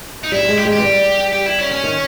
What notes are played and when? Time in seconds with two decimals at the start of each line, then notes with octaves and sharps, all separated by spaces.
0.24 D#4
0.32 G3 E4
0.43 G3
0.49 G#3
0.58 G4
0.65 G#3
0.73 G4
0.78 E3
0.82 G3
1.33 G4
1.46 E4
1.59 C#4
1.72 C#4
1.84 D#3